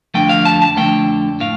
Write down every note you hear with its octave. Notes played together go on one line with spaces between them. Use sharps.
F2 D3 F3 A3 G5
F5
A5
A5
F2 D3 F3 A3 G5
A2 F5